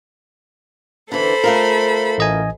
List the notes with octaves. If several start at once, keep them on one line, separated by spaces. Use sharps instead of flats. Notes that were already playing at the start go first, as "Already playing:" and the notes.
D3 E3 A4 C5 B5
A3 F4 A#4
A1 D#5 G#5